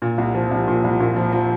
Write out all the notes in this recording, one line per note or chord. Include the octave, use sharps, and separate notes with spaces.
A#2
C2
F3
C2
A#2
C2
A#2
F3
F3